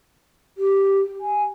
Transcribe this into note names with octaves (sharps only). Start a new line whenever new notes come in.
G4
G#5